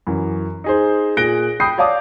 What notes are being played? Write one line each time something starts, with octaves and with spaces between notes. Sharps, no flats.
F#2 E3
D#4 G#4 C5
A#2 G#4 F#6 A#6 D7 G7
G5 B5 D#6 G6 C7
C#5 D5 F5 A5 D6 D#6